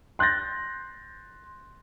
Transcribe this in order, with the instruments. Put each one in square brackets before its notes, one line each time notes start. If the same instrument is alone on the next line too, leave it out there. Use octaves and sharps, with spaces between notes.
[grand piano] C6 F#6 G6 A6 A#6